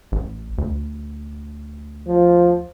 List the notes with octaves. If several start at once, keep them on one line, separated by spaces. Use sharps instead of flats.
A1
D2
F3